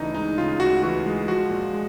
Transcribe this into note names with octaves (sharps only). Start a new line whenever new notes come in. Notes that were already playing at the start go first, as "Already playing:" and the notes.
Already playing: D2 C#3 E3 D4 D#4
G#3 D#4
C#3 F4
D2 F#4
E3 F#4
G#3
F3 F#4
A#2
G#3